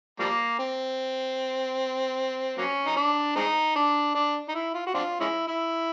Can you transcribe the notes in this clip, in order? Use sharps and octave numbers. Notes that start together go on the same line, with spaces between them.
F3 G3 A#3
C4
F#3 A#3 C#4
D#4
D4
G#3 C4 D#4
D4
D4
D#4
E4
F4
F#4
C4 D4 F4
G#3 C#4 E4
E4